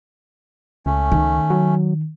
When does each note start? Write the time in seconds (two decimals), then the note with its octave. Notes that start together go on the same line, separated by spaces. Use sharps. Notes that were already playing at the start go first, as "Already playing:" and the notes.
0.86 C#2 A3 C#4
1.12 D#3
1.50 F#3